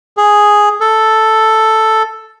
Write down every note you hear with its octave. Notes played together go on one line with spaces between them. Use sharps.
G#4
A4